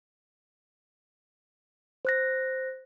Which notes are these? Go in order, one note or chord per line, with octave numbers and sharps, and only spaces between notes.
C5 F#6 A#6